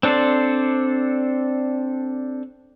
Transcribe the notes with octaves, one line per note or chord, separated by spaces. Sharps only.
C4 D4 A4 C5 D5